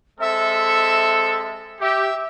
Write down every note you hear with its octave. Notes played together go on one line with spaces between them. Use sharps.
G#3 C4 A4 E5
G4 E5